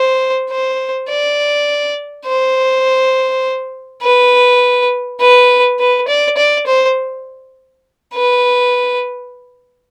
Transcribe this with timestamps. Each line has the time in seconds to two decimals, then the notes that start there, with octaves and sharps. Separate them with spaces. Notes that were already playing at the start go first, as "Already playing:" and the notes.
Already playing: C5
0.50 C5
1.09 D5
2.26 C5
4.02 B4
5.20 B4
5.79 B4
6.08 D5
6.37 D5
6.66 C5
8.14 B4